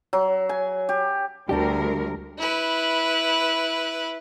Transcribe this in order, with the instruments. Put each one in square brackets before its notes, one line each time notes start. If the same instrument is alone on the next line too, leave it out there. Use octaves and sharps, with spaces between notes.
[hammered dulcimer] F#3
G#5
G4
[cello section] D2 A#4 [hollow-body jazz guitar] G3 D4 G4
[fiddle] E4 B4